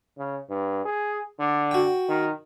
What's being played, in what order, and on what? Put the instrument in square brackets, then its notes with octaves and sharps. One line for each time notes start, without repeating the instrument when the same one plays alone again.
[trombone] C#3
G2
G#4
D3
[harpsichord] F#4 G5
[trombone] D#3